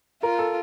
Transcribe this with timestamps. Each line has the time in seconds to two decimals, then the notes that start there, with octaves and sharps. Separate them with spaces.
0.23 F4 A#4
0.39 A4